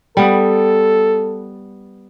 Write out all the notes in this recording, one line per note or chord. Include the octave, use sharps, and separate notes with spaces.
G3 B3 A4